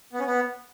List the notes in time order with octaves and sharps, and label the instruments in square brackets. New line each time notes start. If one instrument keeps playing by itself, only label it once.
[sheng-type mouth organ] B3
C#4
B3